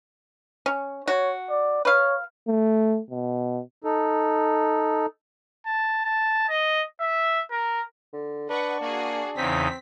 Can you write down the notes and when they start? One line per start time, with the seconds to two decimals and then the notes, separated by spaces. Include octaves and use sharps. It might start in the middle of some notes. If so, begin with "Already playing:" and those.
0.66 C#4
1.08 F#4 C#5
1.50 D5
1.85 B4 C#5 F5
2.48 A3
3.11 B2
3.84 D#4 A4
5.66 A5
6.05 A5
6.49 D#5
7.00 E5
7.51 A#4
8.13 D3
8.50 D4 B4 D#5 F#5 C#6
8.81 A#3 F#4 G#4
9.37 E2 C#3 C4 D#4 B6